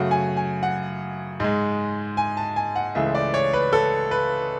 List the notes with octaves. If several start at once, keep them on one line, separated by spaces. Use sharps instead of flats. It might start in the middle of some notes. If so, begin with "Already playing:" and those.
Already playing: F#2 C#3 F#3 A3 F#5
G#5
G#5
F#5
G#2 G#3
G#5
A5
G#5
F#5
C#2 C#3 E3 A3 E5
D5
C#5
B4
A4
B4